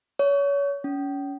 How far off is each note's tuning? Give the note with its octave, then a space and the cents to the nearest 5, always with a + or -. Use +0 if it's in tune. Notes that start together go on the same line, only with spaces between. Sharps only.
C#5 +30
C#4 +30